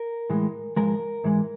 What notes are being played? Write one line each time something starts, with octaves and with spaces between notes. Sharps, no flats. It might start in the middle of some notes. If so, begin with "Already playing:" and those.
Already playing: A#4
A2 E3 G#3
G#2 F3 G#3 A#4
G#2 E3 G#3